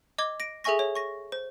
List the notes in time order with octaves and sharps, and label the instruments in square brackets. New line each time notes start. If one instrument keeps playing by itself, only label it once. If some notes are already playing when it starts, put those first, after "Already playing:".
[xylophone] D#5 D6 G#6 G7
A#6 D7
G#4 A4 E5 G#5 C#6 A#6
C#5
C#6 A#6
C5